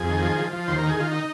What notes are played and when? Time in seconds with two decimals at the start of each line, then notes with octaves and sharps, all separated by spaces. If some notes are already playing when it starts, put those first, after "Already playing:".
Already playing: F2 G#4
0.09 D#3
0.22 F3
0.38 F3
0.53 F3
0.68 D#2 C5
0.78 A#4
0.83 D#3
0.89 G#4
0.97 D#3 F4
1.11 D#4